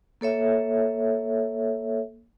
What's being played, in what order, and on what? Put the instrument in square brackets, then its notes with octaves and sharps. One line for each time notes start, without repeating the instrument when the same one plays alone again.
[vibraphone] A#3 A4 C#5 E5